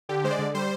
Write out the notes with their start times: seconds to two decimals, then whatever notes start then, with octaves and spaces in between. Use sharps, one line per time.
0.09 D3 G4
0.24 G#3 C5
0.31 D5
0.39 D3
0.55 G3 C5